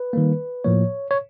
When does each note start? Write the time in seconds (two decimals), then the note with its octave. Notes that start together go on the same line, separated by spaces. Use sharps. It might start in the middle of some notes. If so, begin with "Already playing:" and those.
Already playing: B4
0.13 D#3 G3 A#3
0.64 A2 F3 A#3 C#5
1.11 C#5